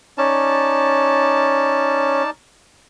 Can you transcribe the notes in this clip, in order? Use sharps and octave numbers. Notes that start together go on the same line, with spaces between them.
C#4 D#4 D5 A5